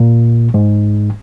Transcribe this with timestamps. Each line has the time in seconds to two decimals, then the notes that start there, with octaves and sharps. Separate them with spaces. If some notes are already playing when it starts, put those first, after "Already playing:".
Already playing: A#2
0.54 G#2